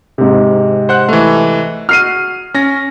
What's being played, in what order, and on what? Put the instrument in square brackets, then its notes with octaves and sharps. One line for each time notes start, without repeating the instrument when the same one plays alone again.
[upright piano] G#2 C3
[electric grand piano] C5 F#5 F#6
E3 A3
[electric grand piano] F#4 [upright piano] F6 C7 D#7
[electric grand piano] C#4 A#6